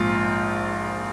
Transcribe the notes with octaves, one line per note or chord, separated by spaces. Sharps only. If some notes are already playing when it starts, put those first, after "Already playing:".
Already playing: A#1 G#2 F3 F4